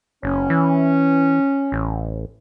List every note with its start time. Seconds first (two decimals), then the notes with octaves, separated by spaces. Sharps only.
0.23 F#1 C#4
0.50 E3
1.72 A1